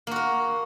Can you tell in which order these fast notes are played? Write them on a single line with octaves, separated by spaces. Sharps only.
A#3 F#4 A#4